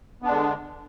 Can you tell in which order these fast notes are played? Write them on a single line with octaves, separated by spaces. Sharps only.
B3 D4 G#3 D3